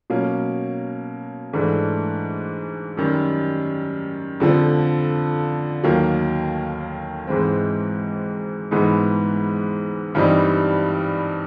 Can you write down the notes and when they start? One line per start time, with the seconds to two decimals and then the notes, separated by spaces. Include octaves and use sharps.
0.10 B2 F#3 A#3 C#4
1.53 G#2 E3 A3 D4
2.97 F#2 D#3 G3
4.40 F2 D3 F3
5.84 D#2 D#3 F#3 A#3
7.27 G#2 E3 G#3 C4
8.71 G#2 E3 G#3 B3 D#4
10.15 G2 E3 G3 C4 D#4